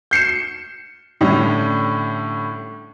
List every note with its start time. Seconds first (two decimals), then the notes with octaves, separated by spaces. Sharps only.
0.11 G6 C7 C#7 E7
1.21 A2 D3 G3 C#4